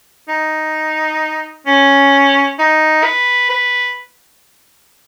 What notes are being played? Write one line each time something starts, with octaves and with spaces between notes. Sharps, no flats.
D#4
C#4
D#4
B4
B4